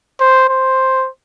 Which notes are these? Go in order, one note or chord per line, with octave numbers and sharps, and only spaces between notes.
C5
C5